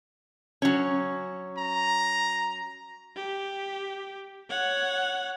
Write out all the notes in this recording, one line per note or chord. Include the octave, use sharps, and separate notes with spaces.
F#3 C#4
A#5
G4
C#5 F#5